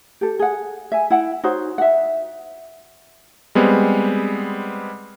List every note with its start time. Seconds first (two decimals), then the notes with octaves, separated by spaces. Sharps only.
0.21 G4 A4
0.39 G#4 F#5
0.92 E5 G#5
1.10 E4 F#5 G5
1.44 D#4 F#4 C5 C#5
1.78 E5 F#5
3.55 G3 G#3 B3 C4